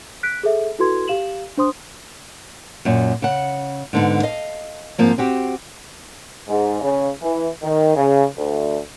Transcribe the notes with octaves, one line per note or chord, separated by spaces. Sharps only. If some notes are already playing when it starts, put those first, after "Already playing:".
F#6 B6 D7
G#4 A4 E5
E4 F#4 A4 B4 C6 G#6
G4 F5 E7 F#7
D4 C5 C6 D#6
F#2 A#2
C#3 F#5
G#2 D3 B3
D#5 F5
G#2 F3 A#3 C4
C4 F#4 G4
G#2
C#3
E3
D#3
C#3
D2